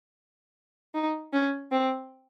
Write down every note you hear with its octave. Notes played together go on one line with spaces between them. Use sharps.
D#4
C#4
C4